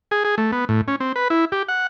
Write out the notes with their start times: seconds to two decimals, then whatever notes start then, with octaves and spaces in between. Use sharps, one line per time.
0.11 G#4
0.25 G#4
0.38 A3
0.52 B3
0.69 A2
0.88 C#4
1.00 C4
1.16 B4
1.30 E4
1.52 G4
1.68 F#5